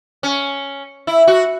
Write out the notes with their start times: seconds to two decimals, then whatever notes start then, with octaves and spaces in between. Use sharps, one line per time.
0.23 C#4
1.07 E4
1.28 F#4